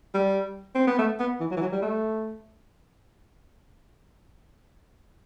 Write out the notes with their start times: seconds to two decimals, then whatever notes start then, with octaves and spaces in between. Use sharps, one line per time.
0.14 G3
0.75 C4
0.87 B3
0.98 A3
1.19 B3
1.40 E3
1.51 F#3
1.57 E3
1.62 F#3
1.72 G3
1.82 A3